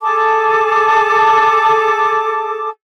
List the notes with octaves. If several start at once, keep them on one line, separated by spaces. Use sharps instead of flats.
G#4 A4 A5 D6